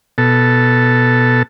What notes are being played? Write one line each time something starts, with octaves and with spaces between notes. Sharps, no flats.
B2 A4